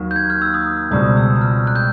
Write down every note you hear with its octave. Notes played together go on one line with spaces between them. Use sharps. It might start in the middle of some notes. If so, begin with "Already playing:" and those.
Already playing: D#2 D#3 F#3
G6
G#6
F6
E6
D#6
C#2 B2 G3 C4 D#6
E6
E6
F6
F#6
G6